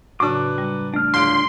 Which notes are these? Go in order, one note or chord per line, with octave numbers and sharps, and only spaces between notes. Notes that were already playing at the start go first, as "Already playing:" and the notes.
A2 C#3 F#3 D4 B4 D6
G3
A3 D4 F6
D1 F4 C6 D7